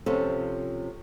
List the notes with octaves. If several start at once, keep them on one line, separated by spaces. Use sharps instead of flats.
C3 F3 C#4 A4